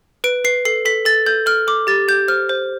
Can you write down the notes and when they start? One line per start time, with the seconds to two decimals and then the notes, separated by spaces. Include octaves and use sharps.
0.24 B4 D7
0.44 B4 C7
0.65 A4 C7
0.85 A4 B6
1.05 A4 A6
1.26 A4 G6
1.46 A4 F6
1.67 A4 D6
1.87 G4 A6
2.08 G4 G6
2.28 C5 F6
2.49 C5